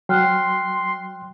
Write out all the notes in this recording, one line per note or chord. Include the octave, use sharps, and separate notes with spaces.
F#3 G5 C6 F6 F#6